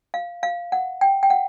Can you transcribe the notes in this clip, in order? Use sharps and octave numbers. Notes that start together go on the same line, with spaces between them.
F5
F5
F#5
G5
G5
F#5